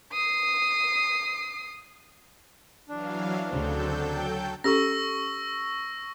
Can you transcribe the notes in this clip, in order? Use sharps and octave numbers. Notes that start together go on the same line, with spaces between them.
D#6 C7
E3 F#3 D4 F5
D2 C#3 F#3 C4 A4 G6
G5
C#4 G4 A4 C#6 E6 A#6